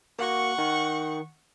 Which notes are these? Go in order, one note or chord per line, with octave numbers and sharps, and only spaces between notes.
A#3 F#4 F#5 C#6
D#3